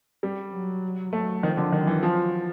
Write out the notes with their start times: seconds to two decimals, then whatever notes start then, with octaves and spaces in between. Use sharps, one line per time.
0.23 G3
0.53 F#3
1.13 F#3 A3
1.43 D#3 F3
1.57 D3
1.72 D#3 F#3
1.87 E3
2.03 F3